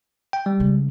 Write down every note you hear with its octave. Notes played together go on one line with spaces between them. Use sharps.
G5
G3
C#3 G#3